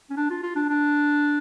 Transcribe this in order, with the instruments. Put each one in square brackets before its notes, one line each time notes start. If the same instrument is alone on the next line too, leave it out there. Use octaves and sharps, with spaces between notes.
[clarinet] C#4
D4
F4
F4
D4
D4